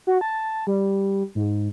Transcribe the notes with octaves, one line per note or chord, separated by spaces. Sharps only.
F#4
A5
G3
G#2